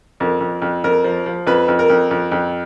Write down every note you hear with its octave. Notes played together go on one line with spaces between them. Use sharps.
F2 A#4
F2
F2
F2 A#4
F3
F3
F2 B4
F2
A#4
F2
F2
F2